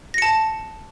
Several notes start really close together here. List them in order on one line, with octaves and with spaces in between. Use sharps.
A#6 C#7 A5